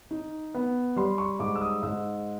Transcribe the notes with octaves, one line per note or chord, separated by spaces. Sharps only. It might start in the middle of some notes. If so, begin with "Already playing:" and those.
D#4
B3
G3 C6
C#6
G#2 D6
E6
D#6
G#2 E6